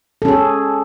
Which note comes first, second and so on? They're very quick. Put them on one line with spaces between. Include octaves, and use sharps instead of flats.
A4 C#4 G#4